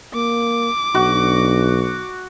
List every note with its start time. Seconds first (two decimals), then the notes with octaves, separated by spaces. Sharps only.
0.14 A#3 D6
0.95 B1 D4 F#4